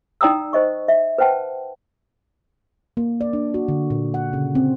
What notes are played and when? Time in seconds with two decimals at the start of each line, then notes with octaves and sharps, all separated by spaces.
0.21 D#4 D5 G5 A#5 D#6 E6
0.53 C5 D#5 C#6
0.88 E5
1.18 B4 C5 F#5 G5 A5
2.97 A#3
3.21 D5
3.33 D4
3.54 F#4
3.68 D3
3.90 A#2
4.14 F#5
4.33 C#3
4.55 C4